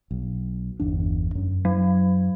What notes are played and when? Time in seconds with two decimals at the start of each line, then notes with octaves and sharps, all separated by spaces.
0.11 B1
0.80 G1 E2 D4
1.35 F#2
1.65 F#3